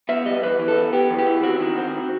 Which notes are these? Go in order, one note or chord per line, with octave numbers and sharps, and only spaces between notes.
B3 E5
G3 D#5
E2 B4
E3
A4
B3
B3 G4
E2
G4
E3
C4 F#4
D#3
C4